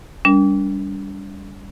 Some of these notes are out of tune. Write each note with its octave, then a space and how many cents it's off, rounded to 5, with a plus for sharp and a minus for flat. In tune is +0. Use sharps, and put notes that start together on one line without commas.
G3 +10 D4 -45 A#4 +0